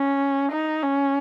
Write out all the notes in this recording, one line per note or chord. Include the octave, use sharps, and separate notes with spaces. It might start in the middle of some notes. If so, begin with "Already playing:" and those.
Already playing: C#4
D#4
C#4